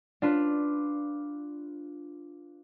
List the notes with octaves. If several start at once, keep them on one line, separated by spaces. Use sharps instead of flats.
D4 F4 B4